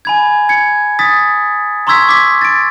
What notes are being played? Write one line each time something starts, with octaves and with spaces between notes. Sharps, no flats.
G#5 B5 G#6
G#6 C#7
D#6 A6 B6
A#5 C6 C#6 E6 G#6 B6
D6 B6
A6 D7